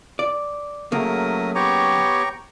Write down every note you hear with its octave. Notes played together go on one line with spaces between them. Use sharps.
D5
F#2 C#3 F#3 A3 A#3 A#4 D#6
B3 G4 C#5 G5 A#5 C#6